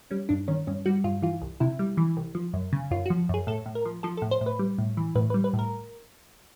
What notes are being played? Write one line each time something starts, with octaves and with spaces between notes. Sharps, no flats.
G3 C#4
G2 D4
D#3 C#4
G2 C#4
G3 F#4
G2 F4
E3 F4
C2
C3 E4
G3
E3
C2
F3
F#2
C#3
F#2 F4
F#4
F3
F#2 G#4
A2 A4
A2
A#4
F3
F3 A4
A4
A2
C5
A2
B4
G3
A2
E3
A2 B4
B4
G3
B4
A2
A#4